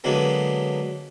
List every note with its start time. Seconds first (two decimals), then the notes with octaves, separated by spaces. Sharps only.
0.04 D3 F#3 G#3 A#3 B3